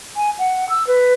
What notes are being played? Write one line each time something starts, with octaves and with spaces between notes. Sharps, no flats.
G#5
F#5
E6
B4